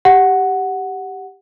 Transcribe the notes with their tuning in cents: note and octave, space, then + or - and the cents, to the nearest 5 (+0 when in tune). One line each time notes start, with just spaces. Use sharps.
G4 +0 F#5 +0